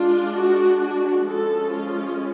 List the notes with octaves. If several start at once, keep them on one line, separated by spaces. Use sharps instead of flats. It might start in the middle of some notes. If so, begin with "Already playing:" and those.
Already playing: G#3 D4 F4
F#4
F#4
F3 G#3 C#4 A4
F4